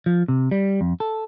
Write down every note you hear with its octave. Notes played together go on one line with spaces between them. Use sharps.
F3
C3
G3
F2
A4